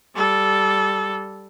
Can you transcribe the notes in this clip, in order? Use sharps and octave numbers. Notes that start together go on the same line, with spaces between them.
G3 A4